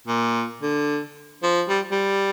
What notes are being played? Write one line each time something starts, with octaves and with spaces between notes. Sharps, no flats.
A#2
D3
F3
G3
G3